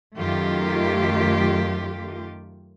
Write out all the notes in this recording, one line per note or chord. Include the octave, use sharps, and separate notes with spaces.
F#2 D#3 A3 F4 G4